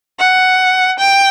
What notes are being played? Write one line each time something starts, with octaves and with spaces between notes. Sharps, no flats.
F#5
G5